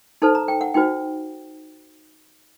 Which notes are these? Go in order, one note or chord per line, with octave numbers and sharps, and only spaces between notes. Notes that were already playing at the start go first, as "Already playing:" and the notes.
D#4 A4 C5 A5
A#5
G5
F#5
D#4 F#4 C5 G5